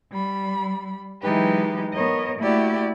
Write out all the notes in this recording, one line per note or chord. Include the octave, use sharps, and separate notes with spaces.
G3 B5
E3 F#3 G#3 D#4 G4 B4
B3 A#4 C#5 D#5
A3 A#3 E4 F#4 G4 D5